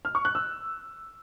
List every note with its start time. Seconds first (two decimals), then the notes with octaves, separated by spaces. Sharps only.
0.05 F6
0.15 C#6
0.25 F#6
0.35 E6